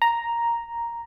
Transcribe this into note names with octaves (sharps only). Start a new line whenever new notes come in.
A#5